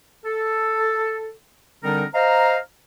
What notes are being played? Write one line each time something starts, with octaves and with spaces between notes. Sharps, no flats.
A4
D3 G3 C4 D4 D#4 A#4
C5 D#5 F5 A#5